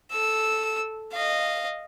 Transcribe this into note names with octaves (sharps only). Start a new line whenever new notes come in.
A4 E6
D#5 F5